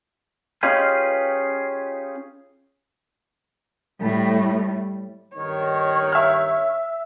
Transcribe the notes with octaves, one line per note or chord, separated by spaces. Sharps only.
C#4 D#4 F4 G4 G#4 B4
A2 G3
G2 D#3 C#5
E5 F6